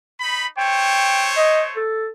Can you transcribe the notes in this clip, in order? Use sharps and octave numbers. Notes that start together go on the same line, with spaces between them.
D#4 B5
A3 C5 C#5 G5
D#5
A4